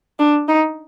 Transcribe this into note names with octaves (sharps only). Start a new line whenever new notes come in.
D4
D#4